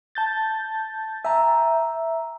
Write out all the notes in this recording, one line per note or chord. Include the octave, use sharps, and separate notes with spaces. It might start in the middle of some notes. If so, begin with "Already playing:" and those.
A5 G6 A6
E5 G#5 A#5